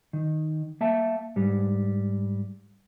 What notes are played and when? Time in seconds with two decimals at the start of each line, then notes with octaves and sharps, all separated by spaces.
0.13 D#3
0.81 A#3 E5 A5
1.36 G#2 G3